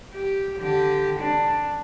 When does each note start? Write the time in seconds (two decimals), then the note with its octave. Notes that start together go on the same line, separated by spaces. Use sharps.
0.14 G4
0.59 D3 G4
1.20 D4